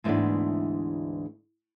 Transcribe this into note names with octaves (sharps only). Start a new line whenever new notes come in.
D2 G#2 E3 G#3 B3 D4